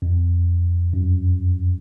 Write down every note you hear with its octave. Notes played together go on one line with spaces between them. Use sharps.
F2
F#2